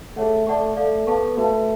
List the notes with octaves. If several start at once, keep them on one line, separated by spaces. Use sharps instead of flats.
A3 G#4 C#5 F#5
A3 A4 D5 F#5 A5 C#6
A3 A4 D5 F5
B3 A4 F5 A5 C#6
A3 F#4 B4 F5 A5